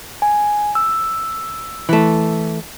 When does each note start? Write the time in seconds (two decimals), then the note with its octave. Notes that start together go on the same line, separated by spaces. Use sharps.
0.22 G#5
0.75 E6
1.89 E3 A3